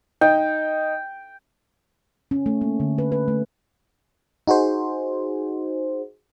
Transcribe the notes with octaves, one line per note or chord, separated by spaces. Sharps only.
D#4 G5
C#4
A3
A#3
D3
B4
B4
A3
D#4 F#4 G#4 C5